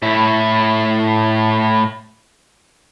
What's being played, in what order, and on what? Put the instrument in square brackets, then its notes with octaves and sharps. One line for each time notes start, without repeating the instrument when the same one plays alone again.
[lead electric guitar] A2 E4